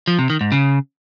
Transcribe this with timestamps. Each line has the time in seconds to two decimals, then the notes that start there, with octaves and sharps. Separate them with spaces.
0.08 F3
0.19 C3
0.30 D#3
0.41 G#2
0.52 C#3